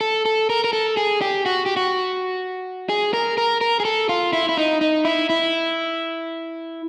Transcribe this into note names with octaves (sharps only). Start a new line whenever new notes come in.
A4
A4
A#4
A#4
A4
G#4
G4
F#4
G4
F#4
G#4
A#4
A#4
A#4
G#4
A4
F4
E4
E4
D#4
D#4
E4
E4